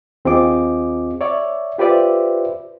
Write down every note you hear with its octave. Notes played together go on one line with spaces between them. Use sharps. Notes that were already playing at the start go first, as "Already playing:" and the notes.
D#2 C4 F4 G#4 D#5 D6
C#5 D5 E5
F4 G4 B4 C5 D5 E5